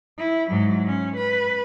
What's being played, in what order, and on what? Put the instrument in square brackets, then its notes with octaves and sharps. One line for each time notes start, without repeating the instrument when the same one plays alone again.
[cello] E4
G#2 F#3
C#4
B4